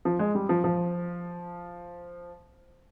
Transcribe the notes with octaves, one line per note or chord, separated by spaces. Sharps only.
F3
G#3
G3
F3
F3